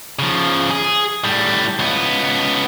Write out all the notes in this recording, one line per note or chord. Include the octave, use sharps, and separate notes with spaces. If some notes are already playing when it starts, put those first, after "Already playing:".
C#3 F3
G#4
A2 G3
C#2 B3